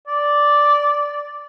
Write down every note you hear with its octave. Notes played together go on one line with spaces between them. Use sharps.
D5